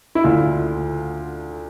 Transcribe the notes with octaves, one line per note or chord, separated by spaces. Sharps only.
E4
D2 D3 F4